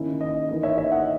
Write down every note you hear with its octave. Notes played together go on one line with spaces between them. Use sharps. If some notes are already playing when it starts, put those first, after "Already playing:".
Already playing: D#3 A#3 C#4 E4
D#5
E3 A#3 D#4 D#5
C#5 E5
C#5 E5
D#5 F#5